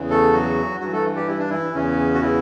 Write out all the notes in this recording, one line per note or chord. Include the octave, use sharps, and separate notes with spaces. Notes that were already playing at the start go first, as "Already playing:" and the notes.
Already playing: E2 C#3 E3
A3 A4
F#3 F#4
G2 E3 F#3 F#4
A3 A4
G3 G4
E4
D4
E3 E4
E2 C#3 E3 C#4
F#4
E3 E4